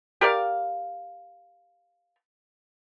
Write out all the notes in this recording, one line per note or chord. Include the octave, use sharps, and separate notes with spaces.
G4 A#4 D5 F5